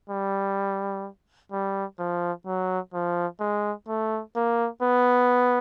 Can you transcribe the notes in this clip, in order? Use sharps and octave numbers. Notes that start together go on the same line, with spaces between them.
G3
G3
F3
F#3
F3
G#3
A3
A#3
B3